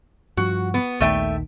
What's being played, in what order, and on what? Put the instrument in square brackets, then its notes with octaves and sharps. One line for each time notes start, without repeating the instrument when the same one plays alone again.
[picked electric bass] G2 F3 [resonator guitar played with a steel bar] F#4
[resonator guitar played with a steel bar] B3
[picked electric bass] A#1 D#2 D#3 [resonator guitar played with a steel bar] A3 E5 G5